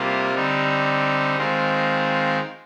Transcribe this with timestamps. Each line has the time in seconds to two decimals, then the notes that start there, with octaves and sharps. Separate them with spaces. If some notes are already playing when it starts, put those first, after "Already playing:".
Already playing: C3 G3 A#3 F4
0.34 D3 G3 C4 D#4
1.37 D#3 G#3 C4 F4